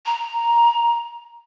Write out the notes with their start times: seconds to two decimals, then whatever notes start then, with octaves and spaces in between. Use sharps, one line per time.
0.06 A#5